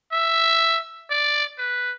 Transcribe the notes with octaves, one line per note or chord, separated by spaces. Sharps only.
E5
D5
B4